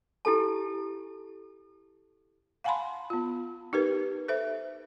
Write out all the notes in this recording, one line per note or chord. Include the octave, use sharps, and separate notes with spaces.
E4 G4 A4 A5
F5 F#5 G#5 A5 B5 C6
B3 F4
D#4 G4 A#4 B4
A4 C5 E5